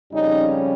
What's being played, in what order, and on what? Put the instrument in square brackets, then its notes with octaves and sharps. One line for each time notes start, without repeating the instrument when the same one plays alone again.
[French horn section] F2 C#3 G3 C#4 D#4